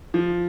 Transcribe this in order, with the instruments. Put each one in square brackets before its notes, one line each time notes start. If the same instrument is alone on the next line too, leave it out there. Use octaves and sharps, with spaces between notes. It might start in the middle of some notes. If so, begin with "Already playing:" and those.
[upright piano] F3